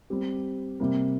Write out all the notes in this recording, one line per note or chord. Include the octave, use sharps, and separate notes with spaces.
G3 C4 G4
C3 G3 A#3